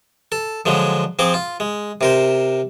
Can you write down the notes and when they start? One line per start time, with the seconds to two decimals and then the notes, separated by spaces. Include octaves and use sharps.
0.32 A4
0.66 D3 F3 F#3 G#3
1.19 F3 C4 G#4 D6
1.34 F4
1.60 G#3
2.01 C3 A#4 C5